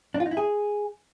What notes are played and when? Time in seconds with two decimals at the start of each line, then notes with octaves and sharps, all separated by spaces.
0.14 D4
0.20 F4
0.26 D#4
0.31 E4
0.37 G#4